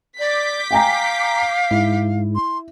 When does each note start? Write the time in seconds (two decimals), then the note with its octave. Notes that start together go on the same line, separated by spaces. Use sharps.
0.19 D5 D6 G6 B6
0.71 F5 G5 G#5 A#5
1.71 G#2 E4
2.35 C6